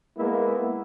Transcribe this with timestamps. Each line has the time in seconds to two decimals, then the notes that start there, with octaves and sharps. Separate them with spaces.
0.18 G#3 A#3 B3 E4